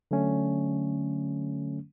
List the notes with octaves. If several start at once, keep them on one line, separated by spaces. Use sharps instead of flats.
D3 F#3 A3 C#4